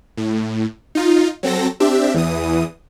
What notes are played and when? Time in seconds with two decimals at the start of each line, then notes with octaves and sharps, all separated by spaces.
0.17 A2
0.95 D#4 F4
1.43 F#3 C4 A4 A#6
1.80 C4 D4 G4 E5
2.15 E2 E3 D#6